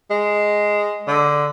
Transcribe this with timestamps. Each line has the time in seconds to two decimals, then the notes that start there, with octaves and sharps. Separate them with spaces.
0.11 G#3
1.08 D3